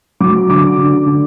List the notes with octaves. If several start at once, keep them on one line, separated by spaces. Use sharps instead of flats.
F#3 D6
D3 D6
D3
D3